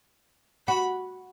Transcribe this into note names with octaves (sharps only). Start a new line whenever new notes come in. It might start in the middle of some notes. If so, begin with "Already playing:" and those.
F#4 B5